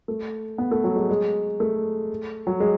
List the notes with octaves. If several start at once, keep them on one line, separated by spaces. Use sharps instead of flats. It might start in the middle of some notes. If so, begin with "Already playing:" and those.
A3
B3
A3
F#3
G#3
G#3
A3
F#3
G#3